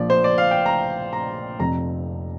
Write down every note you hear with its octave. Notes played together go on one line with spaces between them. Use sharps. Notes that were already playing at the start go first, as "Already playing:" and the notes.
Already playing: A#1 A#2 F3 D5
C5
D5
F5
G5
A#5
A#5
F1 F2 C3 F3 A#5